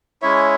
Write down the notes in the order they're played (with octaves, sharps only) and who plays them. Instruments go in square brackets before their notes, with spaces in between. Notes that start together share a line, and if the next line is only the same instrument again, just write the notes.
[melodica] G#3 C#4 E4 C#5 E5